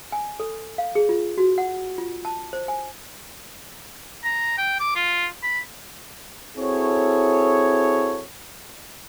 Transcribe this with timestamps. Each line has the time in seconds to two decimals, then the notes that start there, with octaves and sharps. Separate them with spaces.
0.12 G#5
0.40 A4
0.78 F5
0.95 G#4
1.09 F4
1.38 F#4
1.58 F#5
1.98 F4
2.25 A5
2.53 C5
2.68 G#5
4.24 A#5
4.58 G5
4.80 D6
4.96 F4
5.43 B5
6.58 C4 E4 F#4 G#4 A4 C#5